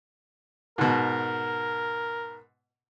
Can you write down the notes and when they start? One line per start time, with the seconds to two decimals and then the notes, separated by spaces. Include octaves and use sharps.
0.78 G#2 B2 A#4